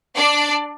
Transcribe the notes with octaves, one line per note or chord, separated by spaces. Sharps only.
D4 D5